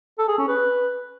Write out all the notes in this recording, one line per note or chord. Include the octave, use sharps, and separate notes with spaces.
A4
G#4
C#4
B4